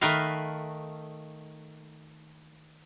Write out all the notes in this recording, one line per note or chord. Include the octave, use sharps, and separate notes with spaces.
D#3 A3 A#4 B4 D#5 F5